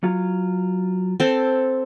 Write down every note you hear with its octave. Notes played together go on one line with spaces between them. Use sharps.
F#3 F4
C4 A4